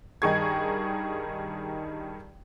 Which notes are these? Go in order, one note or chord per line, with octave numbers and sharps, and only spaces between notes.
G2 D#3 D#4 G#4 C#6 G#6